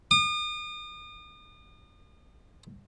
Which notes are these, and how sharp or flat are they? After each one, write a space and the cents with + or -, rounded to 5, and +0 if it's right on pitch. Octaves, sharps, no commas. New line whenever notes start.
D#6 -40